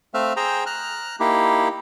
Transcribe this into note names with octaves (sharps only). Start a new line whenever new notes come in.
A3 C4 E5 F5
G#4 C5 G5 A#5
A#5 F6 F#6
A#3 D#4 E4 G4